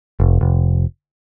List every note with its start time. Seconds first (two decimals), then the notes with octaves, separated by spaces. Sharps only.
0.20 F1
0.41 F1